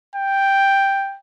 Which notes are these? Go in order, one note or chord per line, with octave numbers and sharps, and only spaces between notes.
G5